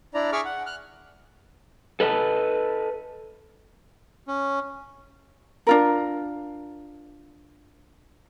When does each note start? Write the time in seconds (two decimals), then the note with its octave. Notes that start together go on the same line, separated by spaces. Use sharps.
0.14 D4 E4 D5 A#5
0.32 G#4 E5 C#6 D6 E6 F6
0.45 F#5
0.66 F6 F#6
2.00 A4 B4 D#5 A5
4.28 C#4
5.67 D4 F4 A#4